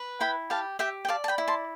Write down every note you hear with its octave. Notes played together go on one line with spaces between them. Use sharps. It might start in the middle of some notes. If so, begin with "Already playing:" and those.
Already playing: B4
E4 G5 B5
G4 F5 A5
G4 E5 G5
G5
D5 F5 A5
A5
G5 B5
E4
A5 C6